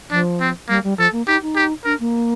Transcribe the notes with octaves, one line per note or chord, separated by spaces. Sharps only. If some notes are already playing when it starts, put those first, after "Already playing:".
F3 D4
C4
G3 A#3
G3
F3 A4
A#3
D#4 G4
D#4
G4
D4 A#4
A#3